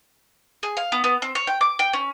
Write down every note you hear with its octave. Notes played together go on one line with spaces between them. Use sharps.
G#4
F5
B3
B3
C4
C#5
G5
D6
G5
C#4